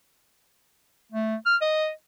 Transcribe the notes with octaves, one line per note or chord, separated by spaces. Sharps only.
A3
F6
D#5